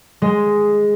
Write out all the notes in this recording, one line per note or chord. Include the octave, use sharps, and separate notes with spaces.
G#3